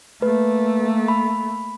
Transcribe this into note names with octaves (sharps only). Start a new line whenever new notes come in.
A3 A#3 B4
B5